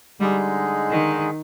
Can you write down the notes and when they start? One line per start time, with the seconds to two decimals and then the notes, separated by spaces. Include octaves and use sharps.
0.20 D3 G3 G#3 D#4 G#4
0.90 D#3